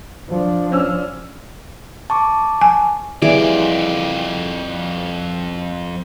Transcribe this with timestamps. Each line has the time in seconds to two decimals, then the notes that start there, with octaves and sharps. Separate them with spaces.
0.29 F3 D4
0.72 C#4 E6 F6
2.10 A5 C#6 D6
2.61 G#5
3.22 F2 E3 G3 G#4 D5